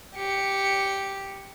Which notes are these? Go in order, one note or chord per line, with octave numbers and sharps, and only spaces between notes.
G4 C#7